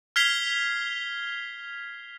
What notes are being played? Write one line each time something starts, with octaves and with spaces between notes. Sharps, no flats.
F6 G#6 B6 C7 F7 G7